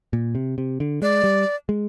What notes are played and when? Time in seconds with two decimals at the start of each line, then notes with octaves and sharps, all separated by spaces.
0.13 A#2
0.35 C3
0.58 C3
0.80 D3
1.02 G#3 D5
1.24 G3
1.69 G#3